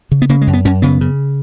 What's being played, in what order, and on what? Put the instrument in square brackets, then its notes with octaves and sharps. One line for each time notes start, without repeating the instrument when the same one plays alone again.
[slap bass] C#3
B3
C#3 A#3
G#3
F#2
B3
F#2 C#4
C#3 B3
C#3